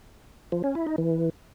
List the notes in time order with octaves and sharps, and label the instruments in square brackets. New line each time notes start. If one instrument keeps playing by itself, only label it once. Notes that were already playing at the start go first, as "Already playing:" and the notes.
[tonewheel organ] F3
C#4
E4
D#4
E3